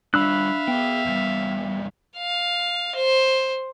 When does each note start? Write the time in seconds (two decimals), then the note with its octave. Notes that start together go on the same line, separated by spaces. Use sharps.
0.14 G3 D4 F4 E5 F5 B5 E6 F#6
0.68 B3 G#4 G5
1.06 E2 G3
2.18 F5
2.95 C5